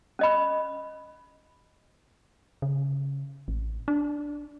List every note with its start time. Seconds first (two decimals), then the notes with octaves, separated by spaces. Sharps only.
0.19 C#4 D#5 B5
2.62 C#3
3.48 A1
3.88 D4